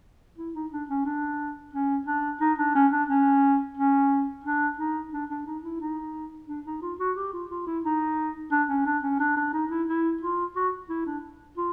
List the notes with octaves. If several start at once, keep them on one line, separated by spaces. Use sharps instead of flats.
E4
D#4
D4
C#4
D4
C#4
D4
D#4
D4
C#4
D4
C#4
C#4
D4
D#4
D4
D4
D#4
E4
D#4
D4
D#4
F4
F#4
G4
F4
F4
E4
D#4
D4
C#4
D4
C#4
D4
D4
D#4
E4
E4
F4
F#4
E4
D4
F4